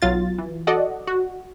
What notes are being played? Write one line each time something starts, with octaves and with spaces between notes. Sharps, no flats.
B1 F#3 F4 A6
E3
F#4 A4 D5 D#5 F#5
F#4